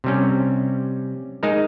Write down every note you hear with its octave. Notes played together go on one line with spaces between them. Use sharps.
C3 G3 C#4
G#3 D#4 A#4